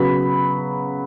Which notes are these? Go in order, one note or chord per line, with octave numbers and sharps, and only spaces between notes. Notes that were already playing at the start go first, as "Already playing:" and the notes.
Already playing: C#3 F#3 B3 B5